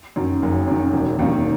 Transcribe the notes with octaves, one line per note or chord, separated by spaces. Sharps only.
F#2 D#3
F#1
F#2 D#3
E1
D#2 D#3